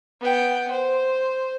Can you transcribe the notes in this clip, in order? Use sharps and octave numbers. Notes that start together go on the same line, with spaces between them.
B3 G5
C5